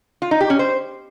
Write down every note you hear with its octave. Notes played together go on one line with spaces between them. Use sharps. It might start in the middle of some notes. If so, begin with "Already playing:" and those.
F4
D#4
G4
C#4
C5